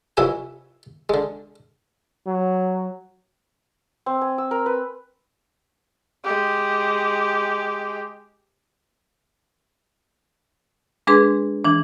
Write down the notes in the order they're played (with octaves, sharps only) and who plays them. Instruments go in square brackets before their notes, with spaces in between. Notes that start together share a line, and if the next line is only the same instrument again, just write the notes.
[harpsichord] C2 F2 F#4 B4 E5 G#5
D3 G#3
[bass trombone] F#3
[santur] C4
G#5
E6
A#4
B4
[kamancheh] G#3 G4
[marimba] G#3 D4 G#4 B4 C6
E3 D4